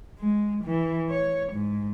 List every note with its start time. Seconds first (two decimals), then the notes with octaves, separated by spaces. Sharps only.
0.19 G#3
0.64 E3
1.10 C#5
1.53 G#2